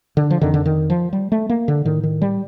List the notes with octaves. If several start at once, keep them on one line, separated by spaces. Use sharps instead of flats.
D3
F3
F2 D3 D#3
D3
D#3
F3
G3
A3
A#3
D3
A2 D#3
D#3
G3